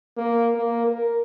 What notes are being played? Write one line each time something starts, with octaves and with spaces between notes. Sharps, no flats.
A#3
A#3
A#4